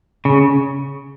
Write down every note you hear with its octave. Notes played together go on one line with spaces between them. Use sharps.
C#3